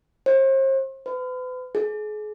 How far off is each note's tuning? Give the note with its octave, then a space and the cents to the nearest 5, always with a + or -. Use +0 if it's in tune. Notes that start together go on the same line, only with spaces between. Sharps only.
C5 +40
B4 +40
G#4 +35